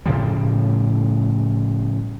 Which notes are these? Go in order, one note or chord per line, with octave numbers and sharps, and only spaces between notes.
A2 C#3 F3 G3